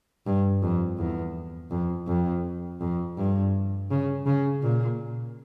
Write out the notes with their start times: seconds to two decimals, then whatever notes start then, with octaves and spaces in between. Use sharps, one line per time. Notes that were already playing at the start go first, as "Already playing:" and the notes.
0.26 G2
0.63 F2
0.98 E2
1.71 F2
2.07 F2
2.81 F2
3.17 G2
3.91 C#3
4.26 C#3
4.62 A#2